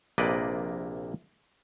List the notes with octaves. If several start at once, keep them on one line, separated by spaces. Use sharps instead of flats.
A#1 C3 A#3 B4 D5 D#5